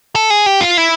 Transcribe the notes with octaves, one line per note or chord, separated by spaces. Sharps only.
A4
G#4
G4
F4
E4